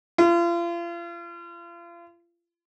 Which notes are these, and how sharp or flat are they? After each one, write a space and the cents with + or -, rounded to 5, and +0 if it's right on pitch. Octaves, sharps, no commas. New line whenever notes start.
F4 -35